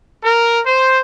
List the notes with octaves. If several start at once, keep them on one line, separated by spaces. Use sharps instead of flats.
A#4
C5